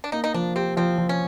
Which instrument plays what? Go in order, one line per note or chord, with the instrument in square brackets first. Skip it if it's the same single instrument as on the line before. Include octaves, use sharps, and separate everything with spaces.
[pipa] D4
[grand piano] A#3 [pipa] D#4
[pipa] D#4
[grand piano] F3 [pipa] D4
[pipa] C4 [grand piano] G4
[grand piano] F3 [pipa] C4
[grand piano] F3
[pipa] C#4